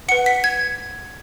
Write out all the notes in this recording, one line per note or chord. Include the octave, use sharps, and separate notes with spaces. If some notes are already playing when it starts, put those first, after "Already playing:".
B4 F#5 C#7
B6
G#6